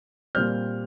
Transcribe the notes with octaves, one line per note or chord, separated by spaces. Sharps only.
A#2 G3 C4 F6 G6